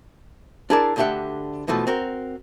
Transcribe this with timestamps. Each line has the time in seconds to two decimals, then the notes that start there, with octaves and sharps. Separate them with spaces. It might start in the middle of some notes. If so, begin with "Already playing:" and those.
0.70 D4 E4 G#4 A#4 D5 A5
0.96 D2 D3 D4 G4 E5 F#5
1.67 E2 B2 E3 F3 A3
1.87 C4 F#4 A#4